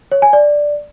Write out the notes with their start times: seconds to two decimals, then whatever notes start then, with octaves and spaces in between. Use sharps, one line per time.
0.12 C#5
0.22 G#5
0.33 D5